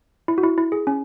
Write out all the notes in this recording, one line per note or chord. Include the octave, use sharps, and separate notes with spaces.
E4
F#4
E4
E4
G#4
C#4